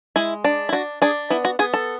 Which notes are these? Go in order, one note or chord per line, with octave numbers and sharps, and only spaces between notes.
G#3 E4
D4
E4
D4 F#4
D4 G#4
B3 E4
F#4
B3 G#4
A4